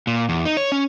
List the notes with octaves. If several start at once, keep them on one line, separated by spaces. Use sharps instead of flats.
A#2
E2
D#4
C#5
C#4